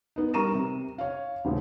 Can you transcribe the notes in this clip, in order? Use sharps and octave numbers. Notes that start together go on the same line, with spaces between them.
B3 D#4
G3 A#4 A#5 C#6 D#7 E7
C3
C#5 F5
D#1 A1 C#3